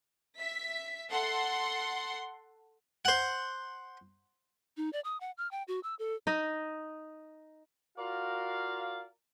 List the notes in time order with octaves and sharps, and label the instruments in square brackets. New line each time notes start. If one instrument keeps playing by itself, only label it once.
[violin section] E5 B6
A4 F#5 C6
[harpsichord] C5 F#5
[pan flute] D#4
D5
D#6
F#5
F6
G5
F#4
E6
A4
[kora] D#4 D#5
[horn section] F4 F#4 A#4 D5 F5